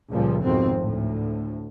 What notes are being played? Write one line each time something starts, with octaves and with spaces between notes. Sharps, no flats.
C#2 A#2 F3 G3
G#1 F2 B2 C4
D2 A2